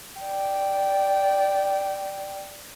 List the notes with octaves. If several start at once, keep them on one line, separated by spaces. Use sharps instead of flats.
D5 G5